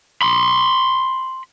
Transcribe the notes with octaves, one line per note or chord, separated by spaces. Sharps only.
B5 C6